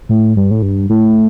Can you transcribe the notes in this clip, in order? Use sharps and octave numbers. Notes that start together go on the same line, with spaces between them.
A2
G2
A2
G2
A2